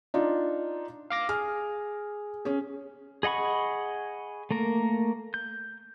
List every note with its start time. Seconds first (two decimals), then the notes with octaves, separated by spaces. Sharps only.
0.14 D4 D#4 F4
1.10 F5 D6 A#6
1.29 G#4 F6
2.45 C#4 G#4
3.23 G#4 D#5 F#5 B5 C#6
4.51 A3 A#3 A#4
5.34 G6